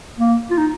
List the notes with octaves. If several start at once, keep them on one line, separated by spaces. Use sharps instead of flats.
A#3
F4
D#4